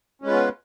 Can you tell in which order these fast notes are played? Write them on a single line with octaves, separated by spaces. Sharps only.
C#4 G#3 B4 F4 B3